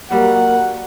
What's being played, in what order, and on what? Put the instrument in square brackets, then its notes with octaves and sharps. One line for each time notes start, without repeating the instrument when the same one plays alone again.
[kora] F#3 G3 [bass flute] A#3 [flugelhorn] F#5